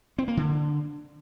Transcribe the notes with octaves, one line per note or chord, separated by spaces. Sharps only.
C4
A#3
D3